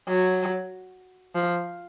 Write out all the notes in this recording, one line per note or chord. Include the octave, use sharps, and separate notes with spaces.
F#3
F3